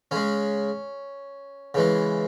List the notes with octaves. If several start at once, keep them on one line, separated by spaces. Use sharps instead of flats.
C#3 G#3 C#4
C#3 E3 G#3